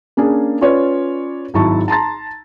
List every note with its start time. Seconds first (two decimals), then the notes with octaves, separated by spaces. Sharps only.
0.17 A#3 C#4 D4 G#4
0.61 C#4 F4 B4 C#5 D5
1.54 G#1 F#3 E4 A5 C#6
1.88 A5 A#5 C6 A6